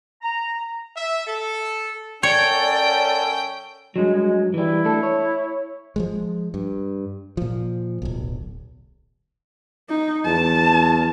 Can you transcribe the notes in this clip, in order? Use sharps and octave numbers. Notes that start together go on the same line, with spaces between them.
A#5
E5
A4
F#2 C#4 A4 C#5 D5 G5
G2 F#3 G#3
G#3
E3 G3 E4
A3 D4 A4
C#5
F3 F#3 G#3
G2
A#2 F3
D1 B1
D#4
E2 A5